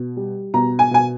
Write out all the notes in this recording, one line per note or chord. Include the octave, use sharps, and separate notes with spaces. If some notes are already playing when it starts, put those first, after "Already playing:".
Already playing: B2
G3
B2 A#5
G#5
B2 G#5